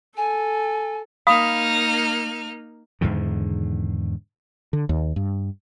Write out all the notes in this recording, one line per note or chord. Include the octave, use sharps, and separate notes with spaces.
A4 G#5
A#3 D#4 F5 B5 D#6 F6
E2 G#2 D3 D#3
D3
D#2
G2